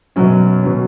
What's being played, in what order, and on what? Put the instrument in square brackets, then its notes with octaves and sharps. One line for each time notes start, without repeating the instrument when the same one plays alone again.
[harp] F#2 [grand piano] B2 F#3 C#4
[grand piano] B2 F#3 C#4